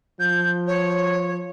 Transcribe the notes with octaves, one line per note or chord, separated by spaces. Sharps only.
F3 G6
C#5